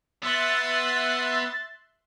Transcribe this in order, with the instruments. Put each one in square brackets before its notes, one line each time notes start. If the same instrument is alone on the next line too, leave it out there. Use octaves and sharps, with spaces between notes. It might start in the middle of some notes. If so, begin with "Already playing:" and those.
[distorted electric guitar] B3 [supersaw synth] E5 C6 F#6 [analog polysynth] A6